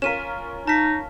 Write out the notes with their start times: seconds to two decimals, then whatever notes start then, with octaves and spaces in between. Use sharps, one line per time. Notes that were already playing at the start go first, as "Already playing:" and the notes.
0.02 C#4 F4 A#4 B6 D#7 E7
0.67 D#4 A5 B6